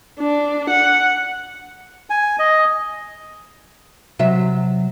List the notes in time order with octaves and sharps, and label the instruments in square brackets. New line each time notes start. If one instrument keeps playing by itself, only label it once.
[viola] D4
F#5
[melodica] G#5
D#5
[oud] C3 F#3 E5